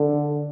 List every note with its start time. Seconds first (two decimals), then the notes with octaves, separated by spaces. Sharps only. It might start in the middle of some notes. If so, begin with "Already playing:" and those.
Already playing: D3